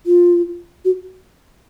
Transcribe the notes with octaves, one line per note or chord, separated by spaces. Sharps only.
F4
F#4